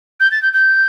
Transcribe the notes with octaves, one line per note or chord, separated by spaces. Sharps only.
G6
A6
G6
G6